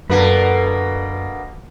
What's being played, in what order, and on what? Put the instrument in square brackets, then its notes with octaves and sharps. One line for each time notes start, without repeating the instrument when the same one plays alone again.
[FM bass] F#2 [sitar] B2 D3 A#3 [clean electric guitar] B4